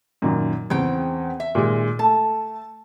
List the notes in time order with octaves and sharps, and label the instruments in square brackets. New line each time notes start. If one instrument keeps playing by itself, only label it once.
[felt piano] F#2 A#2 D#3
[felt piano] E2 C4 [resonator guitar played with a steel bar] C#3 G5
[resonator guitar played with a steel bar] E5
[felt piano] A#2 D#3 G#3
[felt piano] A3 [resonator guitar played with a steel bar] A5